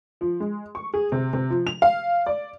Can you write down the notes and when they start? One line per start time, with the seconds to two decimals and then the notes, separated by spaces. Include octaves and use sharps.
0.21 F3
0.40 G#3
0.75 C#6
0.94 G#4
1.12 C3
1.33 C3
1.50 F3
1.67 F7
1.82 F5
2.26 D5